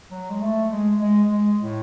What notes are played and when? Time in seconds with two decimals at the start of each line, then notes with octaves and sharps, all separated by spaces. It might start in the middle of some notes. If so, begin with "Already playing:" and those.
0.11 F#3
0.30 G#3
0.41 A3
0.71 G#3
1.01 G#3
1.30 G#3
1.61 A2